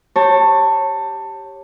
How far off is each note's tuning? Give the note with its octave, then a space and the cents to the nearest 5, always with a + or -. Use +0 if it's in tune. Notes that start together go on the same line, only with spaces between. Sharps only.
G4 +0 C#5 -15 A5 +20